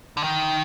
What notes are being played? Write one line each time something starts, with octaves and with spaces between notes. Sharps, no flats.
D3
D#3